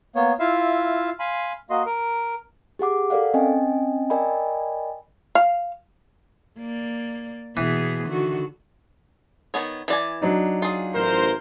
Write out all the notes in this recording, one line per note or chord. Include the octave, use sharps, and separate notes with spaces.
A#3 B3 C#5
E4 F4 E5 F5
F5 G#5 B5 C6
A#3 F#4 D#5 C6
A#4
G4 G#4 F#5 D6
A4 A#4 D5 F5 F#5
C4 C#4 D#5 G5 G#5
A#4 D5 D#5 G5 G#5 B5
F5
A#3 D5
B2 E3 B3 G#4
D3 D#3 F#4
D#3 B3 C#5
E3 D5 G#5
F#3 D4 D#4
F4 G#4
A1 A#4 C5